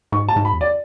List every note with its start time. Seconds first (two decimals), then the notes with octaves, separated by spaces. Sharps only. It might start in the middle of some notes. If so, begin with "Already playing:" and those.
0.12 G#2 C#6
0.29 A5
0.36 G#2
0.45 B5
0.53 E2
0.61 D5